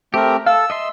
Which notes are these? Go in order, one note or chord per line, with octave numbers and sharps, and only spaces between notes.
A3 C4 G4 A#4
A4 F5 E6
D#5 E5 C6